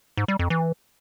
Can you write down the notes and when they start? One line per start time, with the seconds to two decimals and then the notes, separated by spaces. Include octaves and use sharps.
0.17 G#2
0.28 G3
0.39 F2
0.50 E3